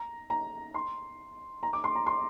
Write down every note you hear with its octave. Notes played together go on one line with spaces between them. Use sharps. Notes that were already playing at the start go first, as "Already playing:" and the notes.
Already playing: A#5
A#5
C6
A#5
D6
C6
A#5
C6